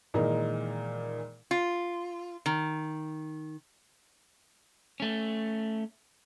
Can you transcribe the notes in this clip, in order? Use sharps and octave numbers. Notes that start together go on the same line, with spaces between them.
A#2 D#3 E3 G#3 D#4 A#4
F4
D#3
A3 C#4